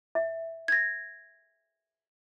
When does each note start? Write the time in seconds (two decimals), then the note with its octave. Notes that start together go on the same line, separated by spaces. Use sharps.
0.15 E5
0.68 G#6 A#6